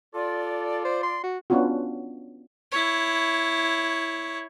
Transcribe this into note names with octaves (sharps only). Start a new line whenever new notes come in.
F4 A4 D5
C5
C6
F#4
B3 C#4 D4 F4 F#4
E4 C#5